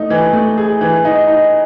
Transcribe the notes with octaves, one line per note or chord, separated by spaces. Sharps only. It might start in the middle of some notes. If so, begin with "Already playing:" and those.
Already playing: A3 D#4
E3
A3
G#4
E3
D#4
D#4